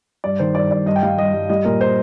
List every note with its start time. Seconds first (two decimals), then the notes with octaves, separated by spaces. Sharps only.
0.24 G2 D5
0.39 D#3 C5
0.55 G2 D5
0.71 G2 D5
0.86 G2 D#5
0.96 G5
1.02 G3 F5
1.18 G2 D#5
1.33 G2
1.49 G3 D#5
1.65 A#2 A#4
1.81 C5